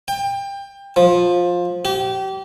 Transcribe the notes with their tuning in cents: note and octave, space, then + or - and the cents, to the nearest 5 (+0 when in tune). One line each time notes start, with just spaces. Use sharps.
G5 +25
F3 +15
G4 -30